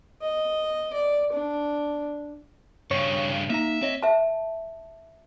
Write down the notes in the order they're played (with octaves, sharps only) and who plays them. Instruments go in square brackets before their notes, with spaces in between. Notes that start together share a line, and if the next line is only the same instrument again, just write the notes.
[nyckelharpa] D#5
D5
D4
[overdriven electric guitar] G2 C#3 [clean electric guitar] C#5
[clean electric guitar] A#3 D#4 A#5 [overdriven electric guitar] E5
[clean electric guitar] C4 C#5 D#5
[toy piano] E5 A5